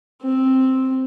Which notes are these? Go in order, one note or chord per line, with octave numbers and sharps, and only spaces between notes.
C4